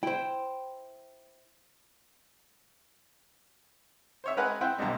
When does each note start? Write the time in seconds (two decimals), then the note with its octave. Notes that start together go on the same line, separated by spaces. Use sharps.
0.03 E4 C5 G5
4.24 C5 C#5 E5
4.37 G#3 A#4 B4 F#5 G#5
4.61 C4 E4 C5 F#5 G5
4.78 B1 B2 D3 G3 G#3